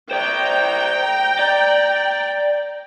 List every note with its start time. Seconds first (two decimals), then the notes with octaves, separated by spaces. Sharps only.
0.11 C5 D5 G5 A#5
1.39 D5